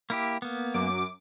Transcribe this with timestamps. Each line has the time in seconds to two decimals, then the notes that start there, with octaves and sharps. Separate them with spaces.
0.10 A#3 E4 G4
0.42 A#3 B3
0.74 F#2 D6